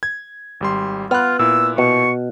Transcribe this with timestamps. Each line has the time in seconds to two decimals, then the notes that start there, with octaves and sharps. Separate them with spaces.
0.03 G#6
0.60 G#1 G3 C6
1.11 B3 F4 F6 F#6
1.39 A#2 E4 E6
1.78 B2 C#6